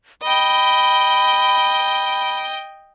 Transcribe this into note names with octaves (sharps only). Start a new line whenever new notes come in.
D#5 G5 B5